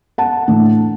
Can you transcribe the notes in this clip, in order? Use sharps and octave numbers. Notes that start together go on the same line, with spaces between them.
F#5 A5
A2 E3 A3 D4